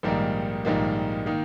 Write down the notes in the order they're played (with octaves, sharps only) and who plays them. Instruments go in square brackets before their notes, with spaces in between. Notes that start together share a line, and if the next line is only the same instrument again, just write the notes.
[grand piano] A#1 G#2 D#3 G3 A#3
A#1 G#2 D#3 G3 A#3
D#3 A#3 D#4